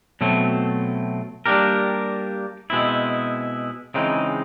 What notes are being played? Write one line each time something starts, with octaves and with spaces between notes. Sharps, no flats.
B2 F#3 A3 C4
G3 A#3 D4 G4 A#4
B2 G#3 C4 E4
C#3 E3 G#3 C4 D#4